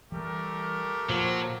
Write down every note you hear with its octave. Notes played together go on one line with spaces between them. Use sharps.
E3 G3 A3 G4 A#4
A#2 F3 F#3